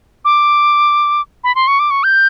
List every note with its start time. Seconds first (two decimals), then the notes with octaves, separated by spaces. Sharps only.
0.25 D6
1.44 B5
1.55 C6
1.68 C#6
1.80 D6
1.91 C#6
2.04 G6